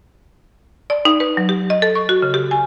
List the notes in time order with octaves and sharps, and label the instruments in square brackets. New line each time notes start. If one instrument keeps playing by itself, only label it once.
[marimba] D5
D#4
B4
F#3
G4
D#5
A4
C#6
F#4
C#3
G4
G#5